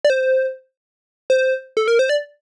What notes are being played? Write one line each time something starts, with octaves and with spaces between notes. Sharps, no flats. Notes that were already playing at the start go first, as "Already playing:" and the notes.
D5
C5
C5
A4
A#4
C5
D5